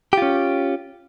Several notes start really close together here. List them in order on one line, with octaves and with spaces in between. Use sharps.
G4 F4 C#4